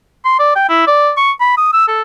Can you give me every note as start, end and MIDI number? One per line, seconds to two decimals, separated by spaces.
0.25 0.39 84
0.39 0.51 74
0.56 0.66 79
0.69 0.85 64
0.87 1.11 74
1.17 1.32 85
1.40 1.55 83
1.57 1.70 87
1.73 1.88 88
1.88 2.02 69